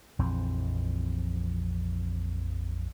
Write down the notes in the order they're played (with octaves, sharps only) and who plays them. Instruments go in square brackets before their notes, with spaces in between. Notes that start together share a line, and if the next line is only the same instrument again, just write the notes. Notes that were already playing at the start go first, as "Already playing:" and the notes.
[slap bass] A#1 F2 E3 C4